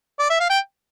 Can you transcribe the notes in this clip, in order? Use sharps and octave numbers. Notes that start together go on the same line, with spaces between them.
D5
E5
F5
G5